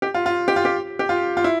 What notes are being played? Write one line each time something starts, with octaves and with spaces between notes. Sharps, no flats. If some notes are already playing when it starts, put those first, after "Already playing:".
G4
F4
F4
G4
F4
G4
G4
F4
F4
E4